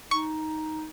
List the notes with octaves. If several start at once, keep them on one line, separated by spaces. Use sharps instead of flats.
D#4 C#6